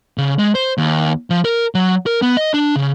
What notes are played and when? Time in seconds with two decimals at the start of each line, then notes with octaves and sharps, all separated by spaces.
0.18 C#3
0.39 G#3
0.55 C5
0.78 D#2
1.30 F3
1.45 A#4
1.75 F#3
2.06 A#4
2.22 B3
2.37 D#5
2.54 D4
2.76 C#3